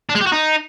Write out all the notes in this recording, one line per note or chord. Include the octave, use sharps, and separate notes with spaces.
D4
G#3
G4
F#4
D#4